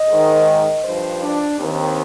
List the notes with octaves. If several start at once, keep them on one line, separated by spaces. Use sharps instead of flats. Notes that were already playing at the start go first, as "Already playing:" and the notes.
Already playing: D#5
G#2 D#3
G2 F3 C5
D4
D#2 D#3 C4